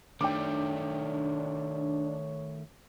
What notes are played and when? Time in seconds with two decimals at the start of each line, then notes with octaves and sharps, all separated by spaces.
0.21 D#3 A3 D4 C#5 G5 D6